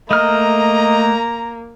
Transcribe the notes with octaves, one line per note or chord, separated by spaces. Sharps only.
A3 A#3 D#5 A#5 F6